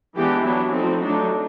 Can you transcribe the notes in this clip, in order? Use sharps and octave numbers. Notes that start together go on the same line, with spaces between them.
E3 G#3 B3 D4 G4
F#3 B3 D4 E4
F3 A3 C4 D#4
F#3 A3 D4 D#4